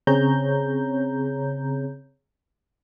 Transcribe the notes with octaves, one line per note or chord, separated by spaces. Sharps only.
C#3 C4 G#4 C#5 A#5 G6